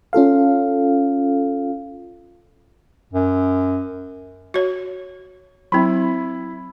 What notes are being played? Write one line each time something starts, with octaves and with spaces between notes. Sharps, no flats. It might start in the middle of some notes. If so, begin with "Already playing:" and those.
C#4 F4 A4 F5
F#2
F#4 C#5
F#3 C4 E4 B5